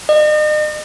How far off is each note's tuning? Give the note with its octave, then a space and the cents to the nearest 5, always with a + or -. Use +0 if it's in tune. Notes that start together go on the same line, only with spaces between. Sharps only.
D#5 -40